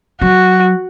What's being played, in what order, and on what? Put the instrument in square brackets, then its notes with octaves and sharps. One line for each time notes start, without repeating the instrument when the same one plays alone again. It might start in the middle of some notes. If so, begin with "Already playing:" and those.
[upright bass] F#3 [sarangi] F#4